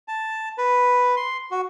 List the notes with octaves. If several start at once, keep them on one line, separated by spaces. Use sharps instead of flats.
A5
B4
C6
F#4